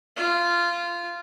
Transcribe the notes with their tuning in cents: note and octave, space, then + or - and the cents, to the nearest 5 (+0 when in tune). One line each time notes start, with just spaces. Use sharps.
F4 -15